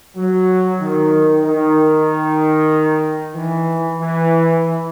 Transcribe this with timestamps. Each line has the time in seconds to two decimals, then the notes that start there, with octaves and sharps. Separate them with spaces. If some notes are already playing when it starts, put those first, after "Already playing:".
0.16 F#3
0.80 D#3
1.44 D#3
3.36 E3
4.00 E3